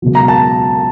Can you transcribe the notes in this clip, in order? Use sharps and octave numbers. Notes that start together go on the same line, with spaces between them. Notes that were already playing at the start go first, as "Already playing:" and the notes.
C#2 B2 F#3
A#5
A5